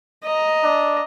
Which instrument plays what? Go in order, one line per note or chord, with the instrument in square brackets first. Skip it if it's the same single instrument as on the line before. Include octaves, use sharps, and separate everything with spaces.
[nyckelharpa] D#5 A#5
[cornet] D4